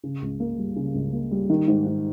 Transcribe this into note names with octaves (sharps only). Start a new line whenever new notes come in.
C#3
C#2
A#3
G3
C#3
C#2
A#3
G3
D#3
G#2
G#2